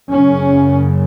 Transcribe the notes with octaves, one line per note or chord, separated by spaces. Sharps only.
F#1 F#2 C#3 C#4